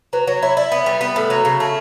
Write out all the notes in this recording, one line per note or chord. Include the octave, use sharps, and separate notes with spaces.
F#3 B4
F#3 C#5
E4 C#5
E4 D5
B3 E5
G3
B3
A2
F#3
C#3
A3